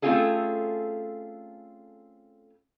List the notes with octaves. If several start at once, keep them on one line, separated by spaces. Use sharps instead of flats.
A3 C4 C#4 F4 G#4 A4